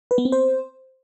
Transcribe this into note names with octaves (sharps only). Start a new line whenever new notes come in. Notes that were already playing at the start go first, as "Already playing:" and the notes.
B4
B3
C4
C5